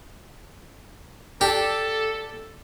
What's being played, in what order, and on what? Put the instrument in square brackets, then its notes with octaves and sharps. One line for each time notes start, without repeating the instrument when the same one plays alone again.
[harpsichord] D4 G4 [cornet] A4